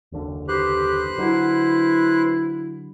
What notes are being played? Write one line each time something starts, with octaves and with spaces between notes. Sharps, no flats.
F#1 D#2 D3
G4 B4 C5 F#6
D3 F#3 E4